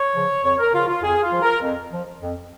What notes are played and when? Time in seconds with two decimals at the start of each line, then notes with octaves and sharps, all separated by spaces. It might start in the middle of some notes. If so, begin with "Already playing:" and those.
Already playing: C#5
0.14 C#3 F3
0.43 F2 C#5
0.58 A#4
0.74 C#3 F3 F4
0.88 F4
1.03 F2 G#4
1.22 F4
1.32 F3
1.42 A#4
1.62 F2
1.92 F3
2.21 F2